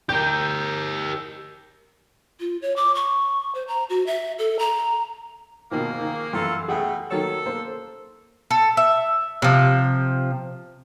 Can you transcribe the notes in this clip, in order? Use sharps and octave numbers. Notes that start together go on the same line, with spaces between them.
G4 A#4 G6
F4
C#5
D6
C#6
C5
A#5
F#4
E5
A4
A#5
G#2 B2 D#3 F3 A#3
D#3
F#2 E3 A#3 F4 A4
B2 A3 G#4 F#5 G5
D#3 F#3 A4 C#5
A#3 C5
A4
E5
C3 F3